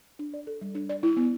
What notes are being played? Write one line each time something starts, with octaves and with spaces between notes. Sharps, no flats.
D4
D5
A4
G3
D4
D5
E4
B3